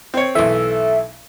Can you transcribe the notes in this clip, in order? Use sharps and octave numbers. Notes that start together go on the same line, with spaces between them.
C4 C#5
B1 E3 A4 E5